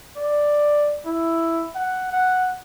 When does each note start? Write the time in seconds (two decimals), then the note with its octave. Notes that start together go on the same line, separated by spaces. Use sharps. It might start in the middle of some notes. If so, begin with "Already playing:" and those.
0.17 D5
1.05 E4
1.75 F#5
2.12 F#5